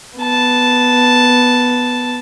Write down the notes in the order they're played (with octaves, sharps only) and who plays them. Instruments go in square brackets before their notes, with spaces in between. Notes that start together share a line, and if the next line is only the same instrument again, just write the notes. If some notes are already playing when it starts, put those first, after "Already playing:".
[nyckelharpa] B3 A5